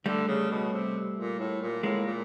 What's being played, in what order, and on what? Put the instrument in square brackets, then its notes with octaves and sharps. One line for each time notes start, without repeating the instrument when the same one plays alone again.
[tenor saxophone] D3 [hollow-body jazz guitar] G3 A3
[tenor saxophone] C#3
B2
C3
A#2
A2
A#2
[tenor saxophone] A2 [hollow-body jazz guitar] G#3 A#3
[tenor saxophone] A#2